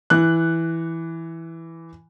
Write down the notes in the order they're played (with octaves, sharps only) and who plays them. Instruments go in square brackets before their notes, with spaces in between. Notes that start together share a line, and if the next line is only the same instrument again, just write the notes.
[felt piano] E3 F#6